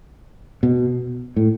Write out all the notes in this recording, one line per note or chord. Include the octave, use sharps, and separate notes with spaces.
B2
A2